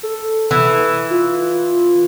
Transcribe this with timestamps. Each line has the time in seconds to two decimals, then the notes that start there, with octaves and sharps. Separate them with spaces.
0.03 A4
0.51 E3
1.10 F4